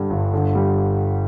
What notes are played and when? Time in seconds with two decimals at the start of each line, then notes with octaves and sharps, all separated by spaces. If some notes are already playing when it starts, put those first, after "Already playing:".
Already playing: G2 D3 G3
0.10 G1
0.34 D3
0.55 G3